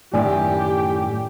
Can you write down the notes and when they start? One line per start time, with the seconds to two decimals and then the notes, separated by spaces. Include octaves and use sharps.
0.13 F#2 A2 D#3 G4 D5 G#5